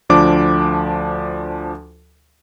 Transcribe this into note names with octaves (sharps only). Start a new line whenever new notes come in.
D2 F3 D4 D6